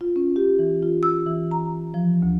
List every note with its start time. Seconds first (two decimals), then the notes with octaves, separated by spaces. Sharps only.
0.01 F4
0.16 C#4
0.36 G4
0.59 E3
0.83 F4
1.03 E6
1.26 E3
1.51 A#5
1.94 F3
2.22 D2